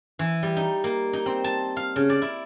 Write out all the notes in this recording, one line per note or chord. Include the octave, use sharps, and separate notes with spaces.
E3
G3
D#4
A#3
D#4
C4
A5
F5
C#3
D5
E4